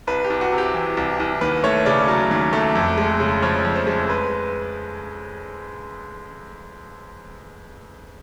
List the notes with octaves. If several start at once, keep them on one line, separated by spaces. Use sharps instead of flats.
C2 B4
G4
C2
F#4
C3
G4
E3
C2
C2
D#2 B4
A3 C#5
C#3 D5
F#3
D#2
A3
F2
G#3
C#3
F3 C#5
F2
C5
G#3
B4